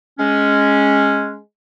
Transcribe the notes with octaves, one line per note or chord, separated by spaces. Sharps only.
G#3 C#4